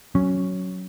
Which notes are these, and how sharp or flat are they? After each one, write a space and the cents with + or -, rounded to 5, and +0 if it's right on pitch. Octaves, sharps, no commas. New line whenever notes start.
F#3 +0 C#4 +0